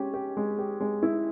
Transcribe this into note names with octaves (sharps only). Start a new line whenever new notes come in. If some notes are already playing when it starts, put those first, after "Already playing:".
Already playing: G#3 C#4 G4
G4
G#3
G4
G#3
E4